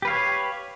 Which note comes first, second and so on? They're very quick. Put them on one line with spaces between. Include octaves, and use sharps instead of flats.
G4 B4 F5 C#5